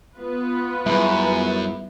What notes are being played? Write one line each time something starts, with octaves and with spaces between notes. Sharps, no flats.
B3 F4 B4
F#2 G3 E4 G#4 E5 B5